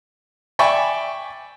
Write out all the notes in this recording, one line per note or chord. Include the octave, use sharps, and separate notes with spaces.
D5 E5 G5 G#5 B5 C#6